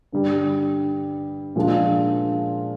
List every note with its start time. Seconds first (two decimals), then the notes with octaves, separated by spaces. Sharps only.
0.12 G2 D3 G3
1.56 A#2 F3 G#3 D4 F4